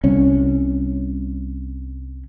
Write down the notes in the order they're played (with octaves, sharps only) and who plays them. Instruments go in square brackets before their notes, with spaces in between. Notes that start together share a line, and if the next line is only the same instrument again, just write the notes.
[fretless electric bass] C2 C#4